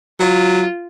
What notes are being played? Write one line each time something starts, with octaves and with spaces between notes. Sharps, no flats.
F#3 F4